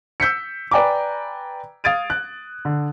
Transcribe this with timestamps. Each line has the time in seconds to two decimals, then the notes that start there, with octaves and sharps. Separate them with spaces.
0.20 E6 G6 B6 C#7
0.71 B4 D5 G5 G#5 A#5 D6
1.84 F5 D#6 G#6 A6 D7 D#7
2.10 F#6
2.65 D3